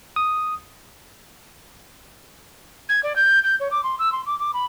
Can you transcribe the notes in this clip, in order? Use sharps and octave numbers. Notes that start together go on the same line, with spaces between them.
D#6
G#6
D5
G6
G6
C#5
D6
C6
E6
C6
D6
D6
B5